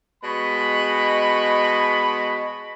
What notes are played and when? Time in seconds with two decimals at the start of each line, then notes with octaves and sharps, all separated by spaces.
0.23 B2 G#3 C#5 D#5 B5